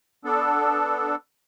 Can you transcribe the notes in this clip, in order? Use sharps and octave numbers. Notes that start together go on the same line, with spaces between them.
B3 D4 A4